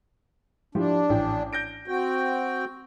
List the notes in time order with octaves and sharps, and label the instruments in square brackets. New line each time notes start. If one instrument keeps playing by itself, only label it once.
[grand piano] F3 E4 G4 [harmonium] D4
[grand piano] A1 G5
G6 A#6 D7
[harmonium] C4 F#4 G5